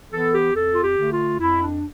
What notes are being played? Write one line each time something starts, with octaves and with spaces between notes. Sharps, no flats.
E3 B3 A4
G4
F2 A4
F4
G4
D3 A3
F4
F2 E4
D4